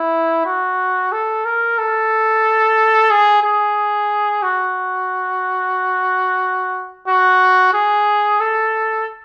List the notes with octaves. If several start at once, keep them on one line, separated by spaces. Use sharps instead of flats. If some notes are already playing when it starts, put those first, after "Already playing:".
Already playing: E4
F#4
A4
A#4
A4
G#4
G#4
F#4
F#4
G#4
A4